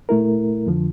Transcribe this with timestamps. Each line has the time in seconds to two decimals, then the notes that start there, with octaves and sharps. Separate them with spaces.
0.09 A#2 A3 E4 A#4
0.66 F2 D3 F3